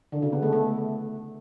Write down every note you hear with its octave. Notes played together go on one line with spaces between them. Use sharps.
D3
C#3
B3
A3
A3